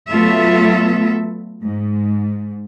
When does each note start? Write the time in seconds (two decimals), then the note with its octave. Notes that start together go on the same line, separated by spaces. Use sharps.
0.12 F#3 A3 B3 F4 A4 E5
1.65 G#2